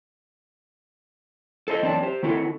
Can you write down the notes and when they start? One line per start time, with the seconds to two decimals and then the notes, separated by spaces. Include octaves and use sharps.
1.68 A4 C5 D#5
1.82 F#2 E3 C4 D4 D5 A5
2.03 G4 C5
2.23 D#3 C4 E4 F#4 A4